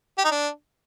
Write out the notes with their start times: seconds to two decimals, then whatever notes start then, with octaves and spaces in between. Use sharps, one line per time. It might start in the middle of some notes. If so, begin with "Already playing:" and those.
0.18 G4
0.25 D#4
0.31 D4